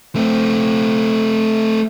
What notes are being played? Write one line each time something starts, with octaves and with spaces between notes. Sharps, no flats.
A3 C4